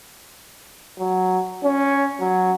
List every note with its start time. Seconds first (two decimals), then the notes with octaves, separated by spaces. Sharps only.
0.99 F#3
1.64 C#4
2.20 F#3